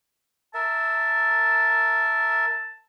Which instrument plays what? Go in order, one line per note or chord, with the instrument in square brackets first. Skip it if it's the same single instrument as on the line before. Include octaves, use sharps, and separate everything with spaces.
[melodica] A#4 E5 [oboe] A5